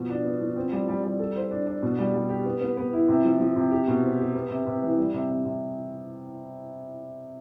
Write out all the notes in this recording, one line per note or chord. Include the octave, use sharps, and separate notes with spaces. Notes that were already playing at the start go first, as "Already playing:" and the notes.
Already playing: B2 F3
D4
B3
F3
C4
G3
G3
G3
A4
C5
D4
D4
B2
G3
G3
G4
B3
B3
B3
E4
C3
F3
F3
C3
G4
B2
C4
G4
B3
C3
C3
E3
G3
C3
C3
C3